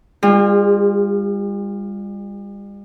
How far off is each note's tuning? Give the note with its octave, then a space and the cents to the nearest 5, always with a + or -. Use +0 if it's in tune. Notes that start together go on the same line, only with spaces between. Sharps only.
G3 +40 F4 +0 G#4 -30